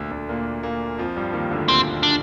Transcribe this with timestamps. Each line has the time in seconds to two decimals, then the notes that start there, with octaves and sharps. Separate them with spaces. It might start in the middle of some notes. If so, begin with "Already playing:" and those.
Already playing: D2 A#2 D3
0.11 D2 D3
0.29 A#2 A#3
0.63 A#2 A#3
0.98 F2 F3
1.17 G2 G3
1.33 D#2 D#3
1.51 D2 D3
1.68 A#2 C4
2.03 D4